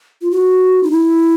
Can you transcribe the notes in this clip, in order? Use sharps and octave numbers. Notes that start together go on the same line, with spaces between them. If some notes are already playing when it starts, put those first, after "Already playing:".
F4
F#4
D#4
E4